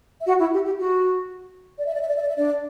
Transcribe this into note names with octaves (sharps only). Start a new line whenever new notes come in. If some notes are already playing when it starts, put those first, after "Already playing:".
E5
F#4 F#5
E4 E5
G4
G4
F#4
D5
E5
D5
E5
D5
E5
D5
E5
D4 D5